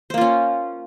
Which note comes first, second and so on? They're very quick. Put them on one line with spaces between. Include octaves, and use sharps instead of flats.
C5 A#3 F4 C#4